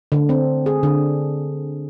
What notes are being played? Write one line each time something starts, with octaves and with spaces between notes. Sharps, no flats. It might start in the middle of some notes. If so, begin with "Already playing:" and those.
D3
C4
G#4
D3